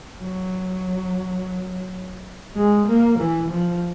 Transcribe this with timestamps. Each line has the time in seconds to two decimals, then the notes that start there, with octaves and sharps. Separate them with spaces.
0.22 F#3
2.56 G#3
2.87 A#3
3.19 E3
3.50 F3